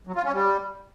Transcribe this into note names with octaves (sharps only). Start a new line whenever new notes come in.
F#3
F4
C#4
G3